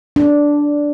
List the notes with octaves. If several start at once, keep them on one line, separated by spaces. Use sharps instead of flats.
D4